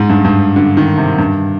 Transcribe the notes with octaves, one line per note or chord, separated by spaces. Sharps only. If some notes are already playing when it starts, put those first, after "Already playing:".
Already playing: G#2
G2
G2
D3
D#3
C3
G2